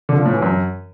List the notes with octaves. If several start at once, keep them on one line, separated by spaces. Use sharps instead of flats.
D3
F3
A2
E3
F#2